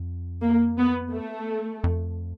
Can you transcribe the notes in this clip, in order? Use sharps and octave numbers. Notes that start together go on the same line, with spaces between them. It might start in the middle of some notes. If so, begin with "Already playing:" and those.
Already playing: F2
A#3
B3
A3
F2